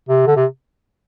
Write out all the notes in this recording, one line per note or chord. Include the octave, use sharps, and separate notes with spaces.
C3
D3
C3